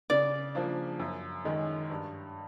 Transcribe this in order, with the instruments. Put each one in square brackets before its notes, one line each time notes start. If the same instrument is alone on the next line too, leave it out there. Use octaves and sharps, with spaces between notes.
[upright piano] C#3 [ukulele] D5
[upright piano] F3 A#3 D4
F#2
D#3 G#3 C#4
G2